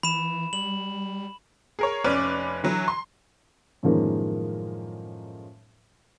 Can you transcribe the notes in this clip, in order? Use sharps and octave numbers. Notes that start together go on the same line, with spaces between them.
E3 B5 E7
G3 F#7
G#4 A#4 C#5
F1 C#4 B4 D5 D6
D3 E3 F#3
C6
F#2 A2 D#3 F3 G#3 A#3